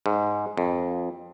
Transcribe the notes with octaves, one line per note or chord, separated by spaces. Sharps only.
G#2
F2